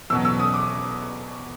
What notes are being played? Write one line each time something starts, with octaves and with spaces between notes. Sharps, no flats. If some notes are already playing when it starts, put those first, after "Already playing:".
E2 B2 F#3 E6
E6
D#6
D6